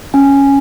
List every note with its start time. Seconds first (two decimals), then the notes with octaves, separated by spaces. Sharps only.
0.14 C#4 G#5